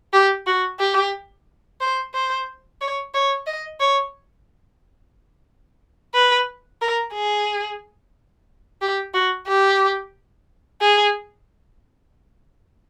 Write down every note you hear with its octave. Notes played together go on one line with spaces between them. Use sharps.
G4
F#4
G4
C5
C5
C#5
C#5
D#5
C#5
B4
A#4
G#4
G4
F#4
G4
G#4